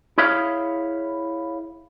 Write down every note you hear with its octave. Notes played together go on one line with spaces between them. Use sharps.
E4 G#4 C#5 E5 F5